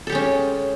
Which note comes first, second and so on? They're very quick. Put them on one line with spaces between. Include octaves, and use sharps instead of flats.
A4 G4 G#3 C#4